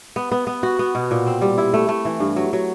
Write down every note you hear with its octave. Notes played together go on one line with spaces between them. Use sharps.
B3
B3
B3
F#4
B3
B2
A#2
C4
G3
E4
A3
A3
E3
G2
F#3
F#3